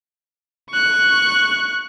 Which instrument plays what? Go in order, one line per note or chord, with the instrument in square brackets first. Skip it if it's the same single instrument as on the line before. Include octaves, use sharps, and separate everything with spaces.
[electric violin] C#6 F#6